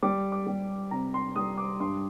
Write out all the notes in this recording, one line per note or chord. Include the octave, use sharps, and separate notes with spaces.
G3 D6
D6
G3
C3 A#5
C6
G3 D#6
D6
G2 C6